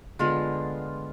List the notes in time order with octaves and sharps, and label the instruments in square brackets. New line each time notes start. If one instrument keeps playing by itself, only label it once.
[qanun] D3 G#3 B3 [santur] F4